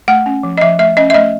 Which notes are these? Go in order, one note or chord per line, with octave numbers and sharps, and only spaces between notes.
A3 F#5
C#4
F3
D#5
F3 E5
A3 E5
C#4 D#5
E5
A3 D#5